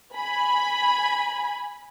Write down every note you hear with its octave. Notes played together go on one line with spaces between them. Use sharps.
G#5 B5